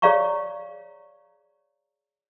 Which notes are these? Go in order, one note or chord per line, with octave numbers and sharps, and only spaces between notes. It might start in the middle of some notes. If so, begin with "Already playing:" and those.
G#4 C#5 D5 F5 A#5 C#6